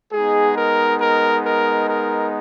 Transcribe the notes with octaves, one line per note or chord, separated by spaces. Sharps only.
G#3 B3 D#4 G#4
A#4
A#4
A#4
A#4